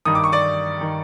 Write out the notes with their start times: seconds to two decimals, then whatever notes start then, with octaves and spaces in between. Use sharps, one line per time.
0.05 G2 D#3 D#6
0.15 D6
0.24 C#6
0.32 D5 D6
0.81 D#3